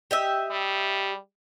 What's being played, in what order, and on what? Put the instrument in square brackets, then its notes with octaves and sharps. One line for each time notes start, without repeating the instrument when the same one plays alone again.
[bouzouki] G4 D#5 E5
[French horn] G3